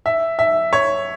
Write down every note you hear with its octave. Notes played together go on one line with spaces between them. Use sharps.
E5
E5
C#5